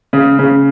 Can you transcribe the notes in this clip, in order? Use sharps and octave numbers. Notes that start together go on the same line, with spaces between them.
C#3
C#3